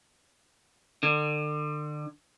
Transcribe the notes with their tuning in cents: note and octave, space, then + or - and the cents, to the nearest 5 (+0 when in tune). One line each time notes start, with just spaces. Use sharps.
D3 +35